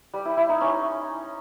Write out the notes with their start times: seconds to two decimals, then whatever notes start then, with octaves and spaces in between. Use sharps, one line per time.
0.14 G3
0.25 E4
0.37 E4
0.49 D#4
0.61 C#4